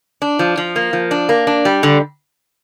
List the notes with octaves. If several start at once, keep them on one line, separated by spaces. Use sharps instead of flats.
D4
F3
F3
A#3
F3
D4
A#3
D4
G3
D3